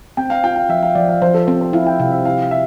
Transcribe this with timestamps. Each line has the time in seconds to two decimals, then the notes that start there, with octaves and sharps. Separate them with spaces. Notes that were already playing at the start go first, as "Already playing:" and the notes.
0.17 C4 G5
0.30 F5
0.44 F4 G5
0.56 F5
0.69 F3 E5
0.82 F5
0.95 F3 D5
1.09 F5
1.22 F3 C5
1.34 A4
1.47 C4 C5
1.61 C5
1.73 E4 F5
1.87 G5
2.00 C3 F5
2.12 E5
2.25 E4 F5
2.51 E5